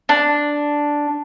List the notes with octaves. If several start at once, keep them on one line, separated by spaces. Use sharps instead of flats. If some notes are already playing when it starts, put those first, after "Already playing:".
D4